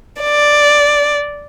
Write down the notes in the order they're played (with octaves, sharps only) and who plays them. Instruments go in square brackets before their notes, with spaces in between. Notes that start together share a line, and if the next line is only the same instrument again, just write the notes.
[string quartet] D5